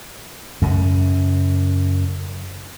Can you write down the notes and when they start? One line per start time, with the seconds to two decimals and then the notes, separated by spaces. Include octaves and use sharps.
0.62 F#2 C#3